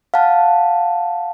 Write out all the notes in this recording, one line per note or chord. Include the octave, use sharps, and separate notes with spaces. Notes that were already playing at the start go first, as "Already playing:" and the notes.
F5 F#5 A5